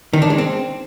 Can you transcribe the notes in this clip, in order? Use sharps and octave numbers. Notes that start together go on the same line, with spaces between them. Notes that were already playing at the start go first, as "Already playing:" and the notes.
D#3
D4
G#3
C4